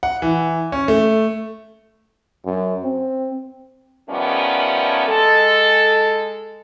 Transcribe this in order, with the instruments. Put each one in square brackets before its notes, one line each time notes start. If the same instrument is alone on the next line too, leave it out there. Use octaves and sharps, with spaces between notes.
[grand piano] F#5
E3
C#4
A3
[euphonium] F#2
C4
[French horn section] D#3 F3 G3 A3 B3 C#4
G#3 A4